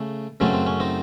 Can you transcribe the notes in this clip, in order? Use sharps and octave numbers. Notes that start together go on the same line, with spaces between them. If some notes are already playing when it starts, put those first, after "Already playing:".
Already playing: C#3 A3
F#2 C#3 F#3 A3 C4 C#4
C4
C#4
C4 D#4